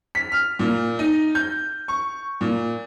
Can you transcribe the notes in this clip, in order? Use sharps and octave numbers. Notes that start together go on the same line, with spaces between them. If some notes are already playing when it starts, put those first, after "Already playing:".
B6
F6
A#2
D#4
G6
C#6
A#2